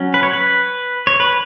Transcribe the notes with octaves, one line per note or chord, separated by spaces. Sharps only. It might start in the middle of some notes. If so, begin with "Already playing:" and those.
Already playing: F#3 C#4
B4
C#5
B4
C#5
B4